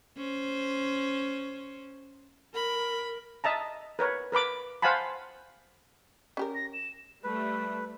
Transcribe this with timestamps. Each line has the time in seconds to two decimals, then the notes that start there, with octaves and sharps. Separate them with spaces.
0.17 C#4 C5
2.54 A#4 B5
3.44 D#5 E5 A5 A#5
3.99 A#4 B4 C#5
4.32 A#4 B4 B5 D6
4.82 C5 F5 F#5 G#5 A5 B5
6.37 C#4 G4 A#4
6.55 A#6
6.73 E7
7.24 G3 A3 B4